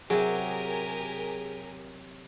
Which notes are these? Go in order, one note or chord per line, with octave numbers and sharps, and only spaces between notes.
C3 F#3 G4 G#4 A#4 G#5